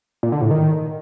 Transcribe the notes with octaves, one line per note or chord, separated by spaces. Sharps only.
A#2
D3
A2
D#3